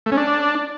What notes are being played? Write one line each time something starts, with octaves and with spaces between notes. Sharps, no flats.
A3
C#4
D4